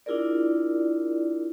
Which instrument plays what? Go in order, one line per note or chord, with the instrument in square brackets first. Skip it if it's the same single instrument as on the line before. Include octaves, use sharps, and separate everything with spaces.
[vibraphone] D4 E4 F4 G#4 A#4 D5